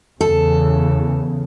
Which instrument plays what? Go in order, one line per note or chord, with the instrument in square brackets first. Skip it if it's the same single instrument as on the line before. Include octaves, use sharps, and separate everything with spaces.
[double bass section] E2 C#3 [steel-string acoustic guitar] A4